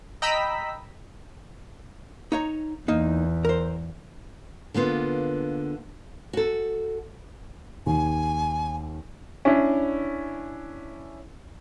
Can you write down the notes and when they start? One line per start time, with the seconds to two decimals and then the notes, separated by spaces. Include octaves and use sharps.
0.22 D#5 G5 A#5 B5 E6 B6
2.32 D#4 C#5 A#5
2.88 E2 A#3 D#4
3.45 A#4 C5
4.74 D3 A#3 B3 F4
6.33 F#4 A4
7.86 D#2 G#5
9.45 C#4 D4 E4